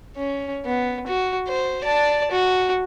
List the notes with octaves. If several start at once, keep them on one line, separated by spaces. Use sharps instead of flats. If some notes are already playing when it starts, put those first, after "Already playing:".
C#4
B3
F#4
C5
D5 A5
F#4